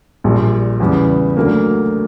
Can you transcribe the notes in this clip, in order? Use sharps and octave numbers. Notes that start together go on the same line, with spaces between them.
A#1 A#2 G3
E2 C#3 G3 B3
D2 D3 F#3 A#3